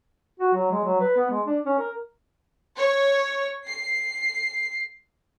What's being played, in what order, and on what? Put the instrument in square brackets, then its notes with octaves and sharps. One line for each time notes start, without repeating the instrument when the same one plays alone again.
[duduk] F#4
F#3
G#3
F#3
B4
B3
G#3
D4
C#4
A#4
[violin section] C#5
C7